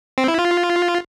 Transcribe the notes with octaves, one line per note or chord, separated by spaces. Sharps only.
C4
E4
F4